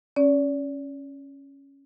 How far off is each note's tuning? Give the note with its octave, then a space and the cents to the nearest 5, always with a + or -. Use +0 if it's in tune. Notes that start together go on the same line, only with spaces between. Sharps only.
C#4 -5 D5 -35